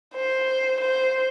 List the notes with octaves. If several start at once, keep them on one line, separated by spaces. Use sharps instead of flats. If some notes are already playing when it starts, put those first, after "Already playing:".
C5
C5